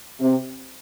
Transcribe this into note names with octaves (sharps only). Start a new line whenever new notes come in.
C3